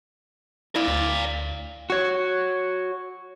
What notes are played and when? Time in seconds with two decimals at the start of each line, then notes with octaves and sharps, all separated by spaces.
0.76 E4 D5 F5
0.88 D2
1.90 F#4 C#5